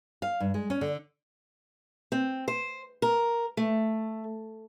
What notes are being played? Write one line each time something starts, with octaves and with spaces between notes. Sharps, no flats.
F5
G2
G#3
C#4
D3
C4
C5
A#4
A3